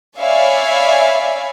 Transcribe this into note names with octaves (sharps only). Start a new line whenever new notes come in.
C#5 D5 E5 F5 G#5 B5